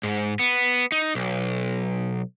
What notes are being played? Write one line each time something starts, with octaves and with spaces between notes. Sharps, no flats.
G#2
B3
D#4
B1